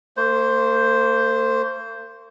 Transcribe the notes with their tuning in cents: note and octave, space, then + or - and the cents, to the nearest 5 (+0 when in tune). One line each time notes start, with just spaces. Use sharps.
A#3 -45 C5 +0